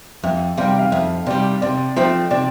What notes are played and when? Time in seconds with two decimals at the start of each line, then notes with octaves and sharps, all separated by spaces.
0.23 F2 E5
0.57 C3 G3 F5
0.68 G5
0.79 F5
0.92 F2 E5
1.26 C3 G3 D5
1.62 C3 D5
1.96 F3 A3 C4 C5
2.31 C3 D5